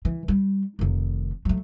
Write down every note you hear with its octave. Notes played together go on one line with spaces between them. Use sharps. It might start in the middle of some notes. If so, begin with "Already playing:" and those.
E3
G3
F1 D#3
F#3 A3